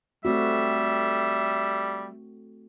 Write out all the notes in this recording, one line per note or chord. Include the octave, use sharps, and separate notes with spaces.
G3 A3 C4 F#4 E5